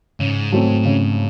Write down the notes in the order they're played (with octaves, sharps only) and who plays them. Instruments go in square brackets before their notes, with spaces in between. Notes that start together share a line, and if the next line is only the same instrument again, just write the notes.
[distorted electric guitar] G#2 [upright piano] C#3
[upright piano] F#3 A3 C4
C#3